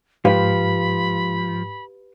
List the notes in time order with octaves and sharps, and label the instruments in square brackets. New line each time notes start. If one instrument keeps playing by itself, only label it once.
[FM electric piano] G#2 [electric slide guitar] F3 [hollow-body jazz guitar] G4 B4 F5 [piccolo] B5